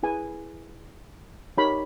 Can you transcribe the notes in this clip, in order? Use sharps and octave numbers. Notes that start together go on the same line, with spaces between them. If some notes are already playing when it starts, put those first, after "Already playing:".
E4 G#4 B4 G#5
D#4 G4 A#4 C#5 B5